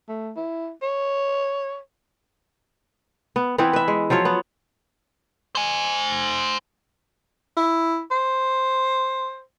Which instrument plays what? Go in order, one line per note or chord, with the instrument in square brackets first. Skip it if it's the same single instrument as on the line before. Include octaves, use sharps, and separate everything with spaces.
[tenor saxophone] A3
E4
C#5
[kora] B3
E3 B3 C4 E4
B4 E5
G#3
F3 F#3 F4 C#5
B3
[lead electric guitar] C5 G#5
[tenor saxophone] E4
C5